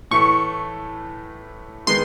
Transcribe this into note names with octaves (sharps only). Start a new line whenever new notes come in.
A2 E3 A3 C#6
D#3 G#3 B3 D#4 C6